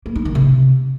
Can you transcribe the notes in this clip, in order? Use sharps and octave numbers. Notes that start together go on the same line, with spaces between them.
A#3
D#4
D#3
C3